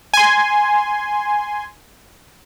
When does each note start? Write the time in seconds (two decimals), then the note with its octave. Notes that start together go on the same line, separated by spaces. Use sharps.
0.14 G#5 C6